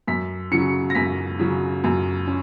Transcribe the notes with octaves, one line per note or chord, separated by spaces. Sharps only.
F#2 B6
C#3 F#3 C#4 C#7
A#6
F#2 B6
C#3 F#3 C#4
F#2
C#4